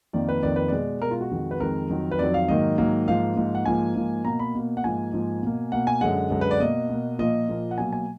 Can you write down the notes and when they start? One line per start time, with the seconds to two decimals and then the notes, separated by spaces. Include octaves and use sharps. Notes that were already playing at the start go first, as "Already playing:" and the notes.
0.13 F2 D#3 A#3 D5
0.29 B4
0.43 F2 D#3 A#3 D5
0.56 B4
0.68 B2 G#3 D5
1.02 B2 G#3 A#4
1.11 F4
1.21 F#4
1.31 F2 D#3 G#3
1.51 B4
1.60 F2 D#3 G#3 A#4
1.90 F2 D#3 F#3
2.11 B4
2.19 F2 D#3 F#3 D5
2.34 F5
2.48 G#2 D#3 F#3 A#3 D#5
2.78 G#2 D#3 F#3 A#3
3.08 G#2 F3 A#3 F5
3.37 G#2 F3 A#3
3.55 F#5
3.66 G#2 F3 A#3 G#5
3.96 G#2 F3 A#3
4.25 B2 A#3 A#5
4.39 B5
4.55 B2 A#3
4.77 F#5
4.84 G#2 F3 A#3 G#5
5.13 G#2 F3 A#3
5.42 B2 A#3
5.72 B2 A#3 F#5
5.87 G#5
6.01 F#2 D3 G#3 F#5
6.30 F#2 D3 G#3
6.41 B4
6.51 D5
6.60 B2 A#3 D#5
6.89 B2 A#3
7.19 A#2 F3 A#3 D#5
7.49 A#2 F3 A#3
7.71 F#5
7.78 B2 F#3 A#3 G#5
7.93 G#5